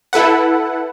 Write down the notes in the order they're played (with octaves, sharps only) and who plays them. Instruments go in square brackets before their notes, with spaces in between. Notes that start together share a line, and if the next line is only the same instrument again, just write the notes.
[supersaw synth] E4 A4 B4 F#5